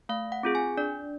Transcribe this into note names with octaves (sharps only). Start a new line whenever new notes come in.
A3 F5
F#5
C4 F4 G#4
G#5
D4 D5